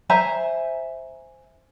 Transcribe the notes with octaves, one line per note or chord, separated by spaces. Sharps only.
C5 E5 G#5 A#5